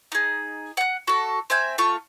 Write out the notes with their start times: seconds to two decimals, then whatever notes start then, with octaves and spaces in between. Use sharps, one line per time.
0.12 D#4 G#4
0.77 F#5 F#6
1.07 F#4 A4
1.50 C4 E5 G#5 G6
1.78 A3 F4 C#6